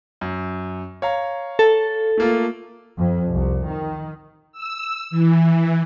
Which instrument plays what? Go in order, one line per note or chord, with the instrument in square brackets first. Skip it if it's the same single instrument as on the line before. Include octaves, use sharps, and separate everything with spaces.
[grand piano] F#2
C#5 F5 A#5
[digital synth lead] A4
[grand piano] A3 A#3 F4
[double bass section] F2
C2
D#3
[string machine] E6
E3